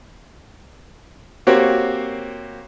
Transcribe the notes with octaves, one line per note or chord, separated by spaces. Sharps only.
A#3 C4 F#4 G4 C5 C#5